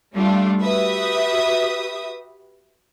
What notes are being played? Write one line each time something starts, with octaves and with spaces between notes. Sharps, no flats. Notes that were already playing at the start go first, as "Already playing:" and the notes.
G3 A3 D4 F4
F#4 G4 B4 E5 D#6